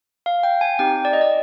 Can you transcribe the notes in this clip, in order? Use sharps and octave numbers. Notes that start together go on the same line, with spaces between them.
F5
G5
G#5
C4 D#4 G4 G5
D5
D#5
D5